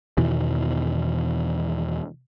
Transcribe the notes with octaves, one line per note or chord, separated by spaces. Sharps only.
E2 B2 D#3 E3